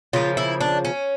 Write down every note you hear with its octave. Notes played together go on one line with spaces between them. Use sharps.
C#3 F3 A#3 F4
E4
D4
C#4